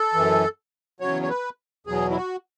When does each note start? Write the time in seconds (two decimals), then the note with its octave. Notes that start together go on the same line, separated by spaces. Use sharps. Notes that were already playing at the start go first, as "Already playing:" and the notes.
Already playing: A4
0.14 F#2 E3
1.00 E2 C#3 F#3 C#5
1.22 C#5
1.29 B4
1.87 E2 B2 F#3 G#4
2.10 E4
2.16 F#4